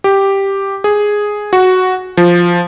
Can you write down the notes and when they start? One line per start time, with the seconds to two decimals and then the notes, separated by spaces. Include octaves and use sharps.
0.04 G4
0.84 G#4
1.53 F#4
2.17 F3